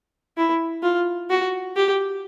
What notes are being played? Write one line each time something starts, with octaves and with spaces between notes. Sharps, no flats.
E4
F4
F#4
G4